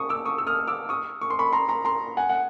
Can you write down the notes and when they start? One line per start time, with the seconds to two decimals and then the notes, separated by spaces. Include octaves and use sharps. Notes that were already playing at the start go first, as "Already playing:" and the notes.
Already playing: C#6 D#6
0.09 D6 E6
0.25 C#6 D#6
0.38 E6
0.47 D#6 F6
0.68 D6 E6
0.89 C#6 D#6
1.21 C#6
1.30 C6
1.39 B5 C#6
1.53 A#5 C6
1.69 A#5 C6
1.85 A#5 C6
2.17 F#5 G#5
2.29 F#5